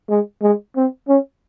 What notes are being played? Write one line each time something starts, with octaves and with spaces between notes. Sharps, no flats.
G#3
G#3
C4
C#4